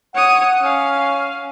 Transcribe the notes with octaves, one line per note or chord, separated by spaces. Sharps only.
C#5 F#5 D#6
C#4 F5